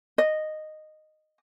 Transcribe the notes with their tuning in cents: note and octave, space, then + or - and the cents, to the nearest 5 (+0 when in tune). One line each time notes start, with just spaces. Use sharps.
D#5 -10